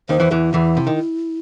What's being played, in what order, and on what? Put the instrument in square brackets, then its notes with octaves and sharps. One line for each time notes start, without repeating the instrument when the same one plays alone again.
[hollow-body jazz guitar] D#2 D#3 [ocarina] C5
[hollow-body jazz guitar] E2 E3
[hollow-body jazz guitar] E2 E3 [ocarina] E4
[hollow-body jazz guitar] E2 E3
C3
D#3